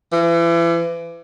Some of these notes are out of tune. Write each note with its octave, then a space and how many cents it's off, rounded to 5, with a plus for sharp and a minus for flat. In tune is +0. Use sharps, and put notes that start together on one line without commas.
E3 +35